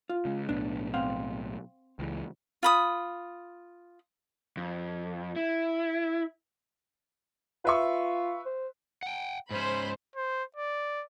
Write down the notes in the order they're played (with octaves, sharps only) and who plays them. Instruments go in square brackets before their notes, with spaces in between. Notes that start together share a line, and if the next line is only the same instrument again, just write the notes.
[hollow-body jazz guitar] F4
[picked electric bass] C#3 G#3
[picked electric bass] B1 A2 B3 [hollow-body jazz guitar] D4
[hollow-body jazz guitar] C4 F5 F#5
[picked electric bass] C#2 E3
[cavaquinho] F4 B5 D#6
[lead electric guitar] F2
E4
[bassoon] F4 [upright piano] B4 E5 C#6
[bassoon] C5
[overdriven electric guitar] F#5 G5
[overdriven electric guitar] G#2 C#4 [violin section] C5 B5
[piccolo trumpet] C5
D5